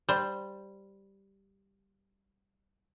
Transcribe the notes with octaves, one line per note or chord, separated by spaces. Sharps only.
G3 C5